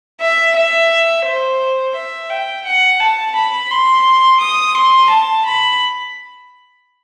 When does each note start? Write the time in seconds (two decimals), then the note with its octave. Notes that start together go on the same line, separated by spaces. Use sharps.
0.21 E5
0.56 E5
1.26 C5
1.96 E5
2.30 G5
2.66 F#5
3.00 A5
3.36 B5
3.70 C6
4.41 D#6
4.75 C6
5.10 A5
5.45 B5